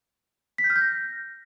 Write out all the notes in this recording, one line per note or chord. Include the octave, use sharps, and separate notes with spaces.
B6
G6
F6
G6
A#6